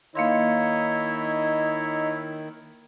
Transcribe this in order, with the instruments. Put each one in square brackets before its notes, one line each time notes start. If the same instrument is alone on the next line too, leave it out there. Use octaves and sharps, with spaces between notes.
[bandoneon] D#3 [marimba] A#3 F5 C6 [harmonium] D#4 C#5 D#5 [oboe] E4